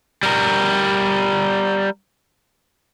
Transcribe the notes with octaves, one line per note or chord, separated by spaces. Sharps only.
G3 A#4